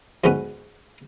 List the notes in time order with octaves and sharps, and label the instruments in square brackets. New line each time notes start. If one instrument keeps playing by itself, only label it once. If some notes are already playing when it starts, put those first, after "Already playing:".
[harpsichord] D2 G#2 B3 C#4 F#5